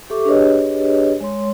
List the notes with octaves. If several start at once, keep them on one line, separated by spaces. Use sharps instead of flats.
G4 A4 E5 C#6 D6
D4 G4 G#4 B4 C#5 D#5
G#3 C#5 C6